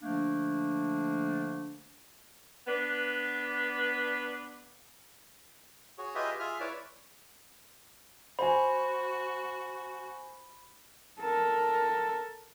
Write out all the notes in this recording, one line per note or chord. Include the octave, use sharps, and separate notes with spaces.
D3 F3 A3 A#3 D4
B3 D4 B4
F#4 G#4 C#5
F4 G4 G#4 B4 D#5 E5
F4 G#4 E5 F6
E4 B4 C#5 D5
F#4 C5 G#5 B5
A4 A#4